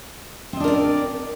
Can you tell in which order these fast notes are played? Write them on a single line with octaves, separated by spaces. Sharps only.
C4 D#5 D4 A#4 D5